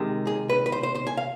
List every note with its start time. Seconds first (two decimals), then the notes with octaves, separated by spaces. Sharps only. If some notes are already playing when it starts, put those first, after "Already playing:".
Already playing: C3 D#3 G#3
0.27 G#4
0.50 B4
0.66 B4
0.72 C5
0.83 C5
0.95 C5
1.07 G#5
1.17 F5